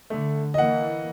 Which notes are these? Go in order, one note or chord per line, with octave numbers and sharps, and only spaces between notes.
D3 A3
E3 A#3 D#5 F#5